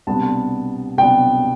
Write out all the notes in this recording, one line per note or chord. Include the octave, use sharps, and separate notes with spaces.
C2 B2 G3 B3 D4 A5
C2 B2 G3 B3 D4 G5